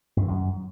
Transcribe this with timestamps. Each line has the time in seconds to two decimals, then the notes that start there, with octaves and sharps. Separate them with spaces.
0.17 G2
0.22 E3
0.28 F#2